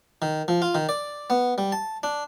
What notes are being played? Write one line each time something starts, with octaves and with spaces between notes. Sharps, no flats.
D#3
F3
F4
D#3
D5
B3
G3
A5
D4